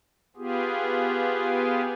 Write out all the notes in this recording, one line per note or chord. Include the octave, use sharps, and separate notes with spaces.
B3 F4 G4 G#4